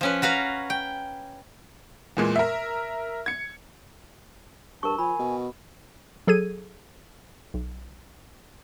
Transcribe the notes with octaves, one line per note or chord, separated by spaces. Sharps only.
F3 C#4 B4
F#4 B4 F5 A#5
G5
E2 A#2 G#3
A#4 E5
G#6 C#7
G2 A#4 A5 C#6
F3 G#5 B5
B2
F#3 G#4 A4 G#6 D#7
B1